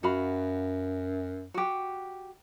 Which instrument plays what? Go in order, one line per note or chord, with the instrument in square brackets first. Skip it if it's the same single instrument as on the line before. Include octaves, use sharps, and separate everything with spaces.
[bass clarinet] F#2 [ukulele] F#4 F5 B5
[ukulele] F#4 G4